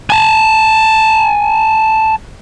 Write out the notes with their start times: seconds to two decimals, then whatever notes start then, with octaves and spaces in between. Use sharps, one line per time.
0.10 G#5 A5